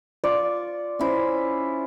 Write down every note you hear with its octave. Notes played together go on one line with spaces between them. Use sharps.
F4 D5 C#6
C#4 E4 C5